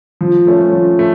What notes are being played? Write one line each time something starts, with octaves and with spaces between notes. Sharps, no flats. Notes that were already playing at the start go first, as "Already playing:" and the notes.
F3
A3 C#4
F3
A3